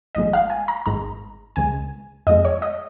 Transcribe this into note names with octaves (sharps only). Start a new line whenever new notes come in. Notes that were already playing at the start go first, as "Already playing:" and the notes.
G#1 G#2 F3 G#3 D#5
F5
G#5
A#5
G#1 G#2 G#3 A#5
C#2 C#3 G#3 G#5
F2 F3 G#3 D#5
C#5
D#5